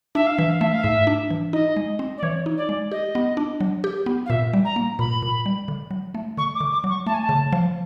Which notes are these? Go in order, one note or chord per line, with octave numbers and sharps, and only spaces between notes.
D4 E5
F5
E3 E5
F5
A3 E5
F5
G#2 E5
D4
E3
D#4 D#5
G#3
C4
D5
E3 C#5
D#4
D5
G#3
G4 D#5
B3
D4
F#3
G4
B3
F5
A#2 E5
G3
A#5
A#3
A#2 B5
A#2
G3
D3
F#3
A3
D3 C#6
D6
D3
D6
F#3
C#6
A3 A5
G#5
A5
C#3
F3